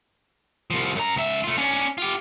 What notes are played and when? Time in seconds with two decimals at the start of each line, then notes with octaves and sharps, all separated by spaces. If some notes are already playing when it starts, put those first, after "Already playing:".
0.71 C2 F3
0.95 F#2 A#5
1.16 C#2 E5
1.44 A3 F4
1.58 C#4 D4
1.98 F4 G4